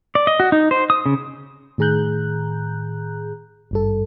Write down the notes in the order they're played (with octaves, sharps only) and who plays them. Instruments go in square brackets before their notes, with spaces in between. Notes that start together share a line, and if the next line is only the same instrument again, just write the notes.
[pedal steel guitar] D5
D#5
F#4
D#4
C5
D#6
C#3
[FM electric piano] A2 D#3 G#4 A#5 F#6 G6
G#1 G2 A4